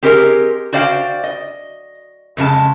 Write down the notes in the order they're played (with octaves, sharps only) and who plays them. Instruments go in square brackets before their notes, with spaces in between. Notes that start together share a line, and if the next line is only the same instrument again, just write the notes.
[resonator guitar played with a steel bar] C4 G4 G#4 A#4 D#5
F#4 C5 D5 F5 G5
D#5
F2 C#3 G#3 A5